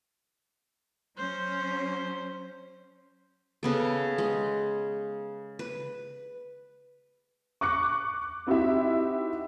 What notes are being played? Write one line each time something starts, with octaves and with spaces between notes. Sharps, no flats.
F#3 C#4 C5
C#3 B3 A4
G#3
B4
C#6 D6 F#6 C#7
C4 D#4 E4 F#4 G4 E5